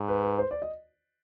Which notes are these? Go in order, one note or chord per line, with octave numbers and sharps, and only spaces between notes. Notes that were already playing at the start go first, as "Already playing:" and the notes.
Already playing: G#2
B4
B4
C5
D5
D#5